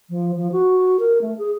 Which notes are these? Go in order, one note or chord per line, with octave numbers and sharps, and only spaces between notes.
F3
F3
F#4
A#4
A3
G#4